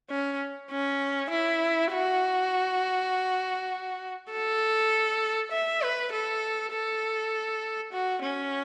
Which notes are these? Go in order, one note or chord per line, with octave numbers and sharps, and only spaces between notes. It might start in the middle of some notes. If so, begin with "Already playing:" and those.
C#4
C#4
E4
F#4
A4
E5
B4
A4
A4
F#4
C#4